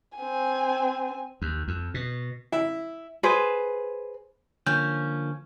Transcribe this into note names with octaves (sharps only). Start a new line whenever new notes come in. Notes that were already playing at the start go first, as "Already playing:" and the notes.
C4 G#5
D#2
F2
B2
E4
G#4 B4 C5
D3 F3 A#3 C#4 G6